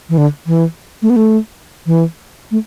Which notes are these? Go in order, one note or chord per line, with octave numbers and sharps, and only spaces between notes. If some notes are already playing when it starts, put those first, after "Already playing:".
E3
D3
E3
A3
B3
A3
E3
A3